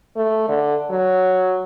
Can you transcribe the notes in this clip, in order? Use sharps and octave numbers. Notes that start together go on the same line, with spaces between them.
A3
D3
F#3